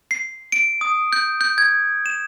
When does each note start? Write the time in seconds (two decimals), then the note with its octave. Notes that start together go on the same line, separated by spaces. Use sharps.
0.11 C7
0.52 D7
0.81 D#6
1.13 G6
1.41 G6
1.58 G#6
2.06 E7